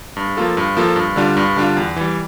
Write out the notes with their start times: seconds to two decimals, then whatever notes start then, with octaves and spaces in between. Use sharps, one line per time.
0.17 G2
0.37 F3 A#3 F4 A4
0.57 G2
0.77 F3 A#3 F4 A4
0.96 G2
1.16 D3 G3 D4 F4
1.37 G2
1.56 D3 G3 D4 F4
1.77 E2
1.96 E3 G3